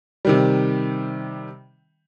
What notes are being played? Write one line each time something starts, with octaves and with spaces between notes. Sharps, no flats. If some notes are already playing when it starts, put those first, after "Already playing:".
C3 D#3 G3